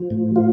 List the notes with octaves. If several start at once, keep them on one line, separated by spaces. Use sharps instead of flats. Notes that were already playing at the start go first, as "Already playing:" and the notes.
Already playing: F3
A2
F3 F4